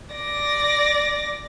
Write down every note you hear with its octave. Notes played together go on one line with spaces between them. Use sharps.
D5 A#6